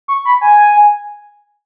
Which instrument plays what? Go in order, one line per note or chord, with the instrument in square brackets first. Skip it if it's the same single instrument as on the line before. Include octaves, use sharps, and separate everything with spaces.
[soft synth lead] C#6
B5
G#5